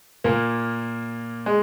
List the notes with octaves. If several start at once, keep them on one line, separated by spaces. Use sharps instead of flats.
A#2 A#3
G#3